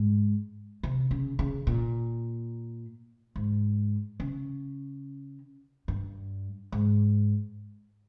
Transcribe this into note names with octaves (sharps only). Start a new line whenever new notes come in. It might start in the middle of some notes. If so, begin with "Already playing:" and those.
Already playing: G#2
C3
C#3
C#3
A#2
G#2
C#3
G2
G#2